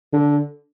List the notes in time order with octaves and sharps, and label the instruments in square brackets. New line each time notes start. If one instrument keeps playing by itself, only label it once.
[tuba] D3